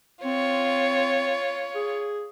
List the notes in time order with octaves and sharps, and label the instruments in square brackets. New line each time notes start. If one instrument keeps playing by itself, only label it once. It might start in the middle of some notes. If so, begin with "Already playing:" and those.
[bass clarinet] C4 [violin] F4 C#5
[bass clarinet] G#4